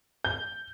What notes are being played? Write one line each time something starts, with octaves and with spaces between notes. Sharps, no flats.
G6